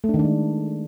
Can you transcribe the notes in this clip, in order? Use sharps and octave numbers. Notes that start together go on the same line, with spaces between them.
A3
D4
D#3
D4
G#3